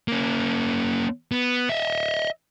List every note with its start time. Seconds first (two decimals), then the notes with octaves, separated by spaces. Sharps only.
0.08 A#3 C#4
1.32 B3
1.69 D#5 E5